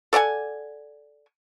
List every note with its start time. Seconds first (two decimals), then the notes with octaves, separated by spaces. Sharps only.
0.13 A4 D5 F#5 G#5